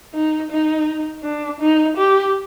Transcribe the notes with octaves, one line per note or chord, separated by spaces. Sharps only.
D#4
D#4
D4
D#4
G4